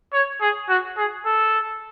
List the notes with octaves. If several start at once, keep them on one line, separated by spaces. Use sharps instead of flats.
C#5
G#4
F#4
G#4
A4